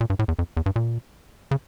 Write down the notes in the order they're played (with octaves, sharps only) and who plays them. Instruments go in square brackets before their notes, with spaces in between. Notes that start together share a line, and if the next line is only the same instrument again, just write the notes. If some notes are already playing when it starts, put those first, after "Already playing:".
[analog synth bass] A#2
G2
A2
E2
F2
E2
G2
A#2
C#3